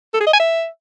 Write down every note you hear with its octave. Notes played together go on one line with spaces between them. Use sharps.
A4
G#4
D#5
G#5
E5